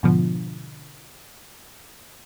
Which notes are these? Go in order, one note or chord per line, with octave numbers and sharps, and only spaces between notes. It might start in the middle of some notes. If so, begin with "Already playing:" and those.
G#2 B2 D3 F3